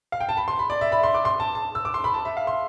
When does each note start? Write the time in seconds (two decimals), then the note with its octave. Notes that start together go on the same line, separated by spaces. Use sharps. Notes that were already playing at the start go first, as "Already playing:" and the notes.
0.12 F5
0.20 G5
0.29 A5
0.37 B5
0.48 C6
0.59 B5
0.70 D5
0.81 E5
0.92 B5
1.03 C6
1.14 D6
1.25 C6
1.40 A5
1.55 A5
1.75 E6
1.85 D6
1.94 C6
2.04 B5
2.14 A5
2.25 E5
2.37 F5
2.47 C6